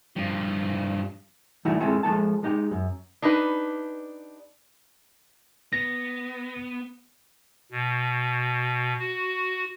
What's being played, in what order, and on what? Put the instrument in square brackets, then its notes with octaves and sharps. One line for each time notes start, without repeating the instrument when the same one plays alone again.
[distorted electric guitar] G2 F3
[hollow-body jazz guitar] E3 G3 A3 D#4 E4 F#4
G#3 C4 C#4 E4 G#4 A4
F3 G#3 A4 A5
G#3 D#4 G4
F#2
[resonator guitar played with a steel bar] D4 D#4 G4 B4
[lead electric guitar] B3 [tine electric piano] A#6
[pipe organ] B2
F#4